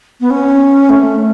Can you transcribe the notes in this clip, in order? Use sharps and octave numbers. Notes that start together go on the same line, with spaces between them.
B3
C#4
A3